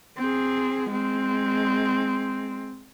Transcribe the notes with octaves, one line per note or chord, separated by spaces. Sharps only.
C4 G#4
G#3 C4